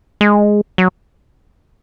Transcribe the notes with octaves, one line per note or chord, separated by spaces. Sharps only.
G#3
F#3